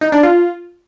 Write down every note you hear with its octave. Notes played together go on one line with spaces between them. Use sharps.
D#4
D4
F4